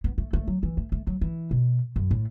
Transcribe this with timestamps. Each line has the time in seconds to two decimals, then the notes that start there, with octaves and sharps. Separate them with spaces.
0.04 B3
0.18 A3
0.33 A3
0.48 F#3
0.63 E3
0.77 A3
0.92 A3
1.07 F#3
1.21 E3
1.51 B2
1.96 F#2
2.11 A2